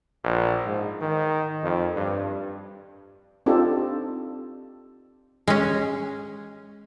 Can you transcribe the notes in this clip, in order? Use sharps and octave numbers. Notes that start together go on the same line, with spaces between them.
A#1
G#2
D#3
F2
G2
C4 D4 D#4 F4 G4 A4
G#3 C#4